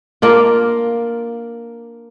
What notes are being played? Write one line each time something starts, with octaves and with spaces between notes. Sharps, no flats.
A#3 D4 F4